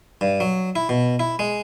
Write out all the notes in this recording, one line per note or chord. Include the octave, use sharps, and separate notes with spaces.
G2
F#3
E4
B2
E4
G#3